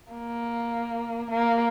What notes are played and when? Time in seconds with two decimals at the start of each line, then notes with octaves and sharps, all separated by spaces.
0.12 A#3
1.31 A#3